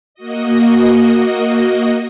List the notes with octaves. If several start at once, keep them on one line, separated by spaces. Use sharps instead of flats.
A#3 F#4 D#5